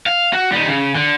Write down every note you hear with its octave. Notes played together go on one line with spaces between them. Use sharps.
F5
F#4
G3 D#4
C#3
D3